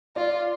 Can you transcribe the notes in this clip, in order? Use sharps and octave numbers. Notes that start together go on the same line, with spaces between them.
F4 D5